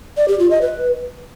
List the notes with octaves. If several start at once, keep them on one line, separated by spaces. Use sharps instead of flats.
D5
G4
F4
D#5
B4